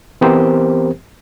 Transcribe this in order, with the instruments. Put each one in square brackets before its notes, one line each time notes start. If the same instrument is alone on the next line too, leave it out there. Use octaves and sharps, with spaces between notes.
[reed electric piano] E3 B3 C4 G4 A#4 C5